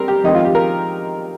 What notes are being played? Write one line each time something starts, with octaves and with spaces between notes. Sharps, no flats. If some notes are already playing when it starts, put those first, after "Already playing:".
Already playing: G3 C4 A#4
G4
F2 D#3 G#3 C4 D#4
F4
G4
A#4